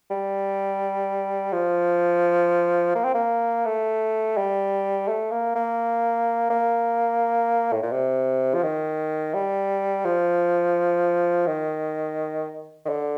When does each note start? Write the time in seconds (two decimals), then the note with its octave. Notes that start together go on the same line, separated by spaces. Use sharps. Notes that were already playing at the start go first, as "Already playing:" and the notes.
0.11 G3
1.53 F3
2.95 A#3
3.05 C4
3.15 A#3
3.66 A3
4.37 G3
5.08 A3
5.32 A#3
5.55 A#3
6.50 A#3
7.73 A2
7.83 A#2
7.92 C3
8.54 F3
8.63 D#3
9.34 G3
10.05 F3
11.47 D#3
12.85 D#3
12.89 D3